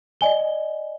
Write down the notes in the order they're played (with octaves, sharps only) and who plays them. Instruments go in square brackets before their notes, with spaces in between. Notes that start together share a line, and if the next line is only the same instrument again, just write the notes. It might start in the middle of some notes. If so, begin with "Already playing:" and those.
[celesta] D5 D#5 G#5 G7